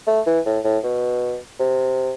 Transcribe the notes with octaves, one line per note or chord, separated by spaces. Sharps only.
A3
E3
A2
A2
B2
C3